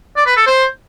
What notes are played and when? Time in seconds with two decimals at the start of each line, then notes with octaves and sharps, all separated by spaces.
0.17 D5
0.27 B4
0.37 A4
0.47 C5